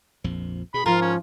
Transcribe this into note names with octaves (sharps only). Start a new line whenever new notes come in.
A#1 F2 F3
B2 G#4 B5
G#2 F3 F4 A#4
C#4